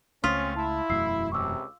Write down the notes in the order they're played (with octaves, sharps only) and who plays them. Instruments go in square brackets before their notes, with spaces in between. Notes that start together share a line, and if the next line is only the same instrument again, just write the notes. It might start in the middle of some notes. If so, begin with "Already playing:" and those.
[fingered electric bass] C#2 A3 [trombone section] C4 C#4 [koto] F4 [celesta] D#6 B6
[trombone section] E4 [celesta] A5 C6
[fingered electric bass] E1 F#2 A3 [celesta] E6 C7
[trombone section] C#2 C3 [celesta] C#6 D6 E6